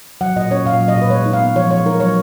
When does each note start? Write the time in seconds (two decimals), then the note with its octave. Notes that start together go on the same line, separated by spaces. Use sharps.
0.21 F#3 F#5
0.36 A#2 D#5
0.51 C#4 C#5
0.65 A#2 F5
0.80 F#3
0.88 D#5
0.95 A#2
1.02 B4
1.10 G#3 C#5
1.26 D#4
1.33 F5
1.41 B3
1.55 F3 C#5
1.70 G#3 C#5
1.85 D#4 A#4
2.00 F#3 C#5